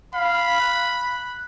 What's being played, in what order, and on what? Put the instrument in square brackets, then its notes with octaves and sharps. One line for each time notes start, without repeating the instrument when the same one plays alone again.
[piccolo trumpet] F5 [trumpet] B5
[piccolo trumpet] F#6